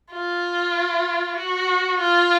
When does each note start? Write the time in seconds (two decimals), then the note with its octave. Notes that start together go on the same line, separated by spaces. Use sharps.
0.12 F4
1.37 F#4
2.00 F4